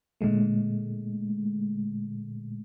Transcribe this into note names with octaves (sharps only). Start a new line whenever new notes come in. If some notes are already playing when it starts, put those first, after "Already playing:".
A#2 D3 G#3 A3